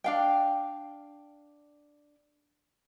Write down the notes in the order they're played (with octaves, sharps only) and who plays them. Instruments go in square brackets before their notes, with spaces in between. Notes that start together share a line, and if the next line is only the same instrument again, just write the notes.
[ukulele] D4 F5 G5